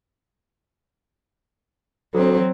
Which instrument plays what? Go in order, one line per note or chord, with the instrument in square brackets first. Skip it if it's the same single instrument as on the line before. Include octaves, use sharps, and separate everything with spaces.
[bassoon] D2 [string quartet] F#3 C4